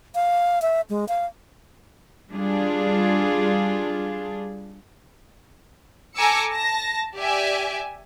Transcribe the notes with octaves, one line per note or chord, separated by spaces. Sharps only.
F5
E5
G#3
F5
G3 D4 F4 G#4
A4 G#5 A#5 D6 E6 C#7
A5 A#6
G4 D5 E5 G#5